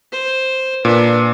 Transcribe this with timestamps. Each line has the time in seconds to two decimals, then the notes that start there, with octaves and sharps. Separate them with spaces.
0.12 C5
0.85 A#2 D4 B4